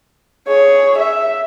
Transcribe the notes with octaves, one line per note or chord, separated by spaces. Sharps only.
G#4 C#5
E5